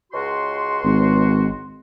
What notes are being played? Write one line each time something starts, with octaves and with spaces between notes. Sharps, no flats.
C#2 F#4 C6
G#1